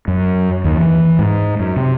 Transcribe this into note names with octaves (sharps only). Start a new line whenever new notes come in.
F#2
D#2
E3
G#2
F#2
C3